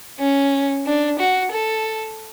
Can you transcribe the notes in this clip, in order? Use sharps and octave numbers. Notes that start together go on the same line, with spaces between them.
C#4
D4
F#4
A4